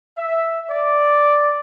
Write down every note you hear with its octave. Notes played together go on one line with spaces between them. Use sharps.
E5
D5